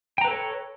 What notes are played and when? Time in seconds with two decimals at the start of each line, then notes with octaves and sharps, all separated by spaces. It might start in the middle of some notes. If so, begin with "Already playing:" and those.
0.18 G5
0.21 A#5
0.25 B4
0.28 A4
0.31 C#5